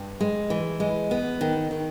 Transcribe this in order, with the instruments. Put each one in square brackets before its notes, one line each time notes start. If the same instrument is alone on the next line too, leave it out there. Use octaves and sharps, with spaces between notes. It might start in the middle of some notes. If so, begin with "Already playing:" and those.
Already playing: [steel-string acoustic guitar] G2
G#3
E3
G#3
B3
D#3
D#3